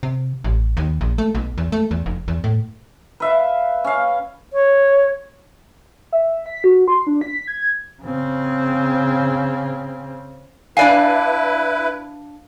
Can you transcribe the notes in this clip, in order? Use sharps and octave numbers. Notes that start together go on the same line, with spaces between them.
C3
A1
D#2
A#1
A3
B1
E2
A3
E2
F1
E2
A2
B4 E5 F5
C#4 F5
C#5
E5
B6
F#4
C6
D4
B6
G#6
C#3 C4
D4 E4 B4 D5 F5 G#5